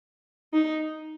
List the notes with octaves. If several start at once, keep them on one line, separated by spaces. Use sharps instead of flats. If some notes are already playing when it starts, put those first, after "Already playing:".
D#4